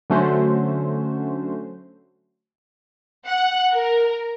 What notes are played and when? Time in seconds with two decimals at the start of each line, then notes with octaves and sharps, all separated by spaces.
0.10 D3 F#3 A3 C#4 F#4 C5
3.25 F#5
3.71 A#4